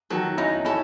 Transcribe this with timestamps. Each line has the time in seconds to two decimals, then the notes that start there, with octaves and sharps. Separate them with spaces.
0.10 D#3 F#3 A4
0.38 C#4 D#4 E4
0.65 C#4 E4 A4